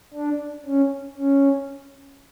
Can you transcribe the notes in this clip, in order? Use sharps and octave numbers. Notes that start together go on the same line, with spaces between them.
D4
C#4
C#4